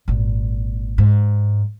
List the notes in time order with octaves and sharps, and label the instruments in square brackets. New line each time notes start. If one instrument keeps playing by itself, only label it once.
[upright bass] G#1 A#2
G#2